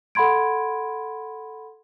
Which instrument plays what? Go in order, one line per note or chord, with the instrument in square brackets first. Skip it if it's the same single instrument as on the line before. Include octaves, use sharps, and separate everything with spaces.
[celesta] A4 F#5 B5 C6 G#6 D7